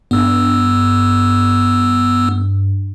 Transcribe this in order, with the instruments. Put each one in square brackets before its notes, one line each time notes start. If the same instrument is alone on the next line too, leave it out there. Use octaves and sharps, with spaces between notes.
[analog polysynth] G2 [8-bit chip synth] B3 E6